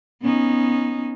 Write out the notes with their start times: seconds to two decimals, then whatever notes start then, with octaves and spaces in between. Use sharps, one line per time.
0.22 B3 C#4 D#4